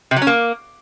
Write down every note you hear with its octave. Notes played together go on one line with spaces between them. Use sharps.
C3
F#3
C#4
A#3